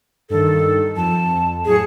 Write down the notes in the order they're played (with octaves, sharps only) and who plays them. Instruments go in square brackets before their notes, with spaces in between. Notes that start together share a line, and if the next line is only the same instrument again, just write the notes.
[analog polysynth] G2 D#3 [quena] A4
[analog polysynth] F2 [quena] A5
[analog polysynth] A2 F#3 C#7 [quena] G#4